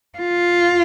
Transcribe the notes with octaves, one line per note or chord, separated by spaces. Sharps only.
F4